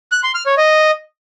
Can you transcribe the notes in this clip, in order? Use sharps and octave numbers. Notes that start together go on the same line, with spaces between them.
F#6
C6
F6
C#5
D#5